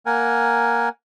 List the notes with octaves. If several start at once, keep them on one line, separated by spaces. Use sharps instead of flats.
A#3 A#4 F#5 G#5